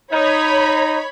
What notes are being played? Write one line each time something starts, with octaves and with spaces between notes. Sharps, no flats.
D#4 C#5 B5